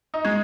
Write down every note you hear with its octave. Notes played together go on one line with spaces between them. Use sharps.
D#4
G#3